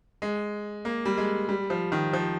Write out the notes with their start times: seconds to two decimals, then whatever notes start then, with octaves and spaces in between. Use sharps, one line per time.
0.22 G#3
0.85 A#3
1.06 G3
1.18 G#3
1.49 G3
1.70 F3
1.92 D#3
2.13 F3